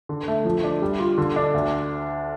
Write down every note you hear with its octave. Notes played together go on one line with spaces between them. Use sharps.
D3
A3
F3
D4
G3
F4
D3
D4
D2